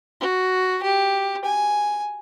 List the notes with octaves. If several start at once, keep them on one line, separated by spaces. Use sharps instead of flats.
F#4
G4
G#5